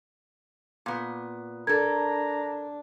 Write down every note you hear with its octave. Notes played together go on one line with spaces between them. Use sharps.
A#2 B3
D4 A4 A#4 A#5 G#6